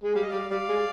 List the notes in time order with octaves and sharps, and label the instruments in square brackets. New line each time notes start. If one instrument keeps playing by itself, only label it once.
[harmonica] G#3
[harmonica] G3 [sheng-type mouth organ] F5
[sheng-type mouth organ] D#5
[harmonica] G3 [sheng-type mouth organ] D5 F5
[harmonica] G3 [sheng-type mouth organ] D5 F5
[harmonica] G#3